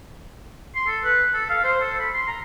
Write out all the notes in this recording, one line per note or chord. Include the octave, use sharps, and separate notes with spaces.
C6
A4
B4
A4
F5
C5
A4
B5
C6
A#5